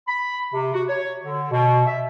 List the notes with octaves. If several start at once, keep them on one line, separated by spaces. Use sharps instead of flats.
B5
C3
F#4
C#5
D3
B2
E5